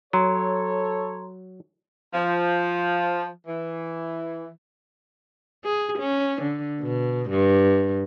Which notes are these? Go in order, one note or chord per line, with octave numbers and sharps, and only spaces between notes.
F#3 A4 C#5 A#5 C6
F3
E3
G#4
C#4
D3
B2
G2